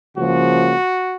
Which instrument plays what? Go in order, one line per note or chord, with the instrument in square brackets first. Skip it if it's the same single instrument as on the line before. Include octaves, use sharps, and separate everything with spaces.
[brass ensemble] C#2 C#3 F3 A#3 F#4